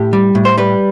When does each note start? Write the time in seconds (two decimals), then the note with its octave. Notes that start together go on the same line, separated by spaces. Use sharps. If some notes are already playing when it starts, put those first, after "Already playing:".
Already playing: A2 G4
0.13 G3
0.35 A2
0.45 C5
0.58 G3 B4